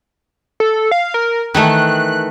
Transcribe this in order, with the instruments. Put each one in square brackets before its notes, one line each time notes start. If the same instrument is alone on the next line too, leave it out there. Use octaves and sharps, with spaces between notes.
[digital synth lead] A4
F5
A#4
[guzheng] D#3 E3 A3 [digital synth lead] F#6